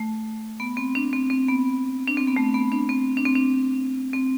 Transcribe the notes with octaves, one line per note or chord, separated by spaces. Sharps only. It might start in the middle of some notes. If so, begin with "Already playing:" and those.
Already playing: A3
B3
C4
D4
C4
C4
B3
D4
C4
B3
A3
B3
D4
C4
D4
C4
D4
C4